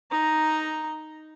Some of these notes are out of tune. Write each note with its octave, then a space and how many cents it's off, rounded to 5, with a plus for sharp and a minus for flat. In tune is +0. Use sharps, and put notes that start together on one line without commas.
D#4 +0 A#5 +0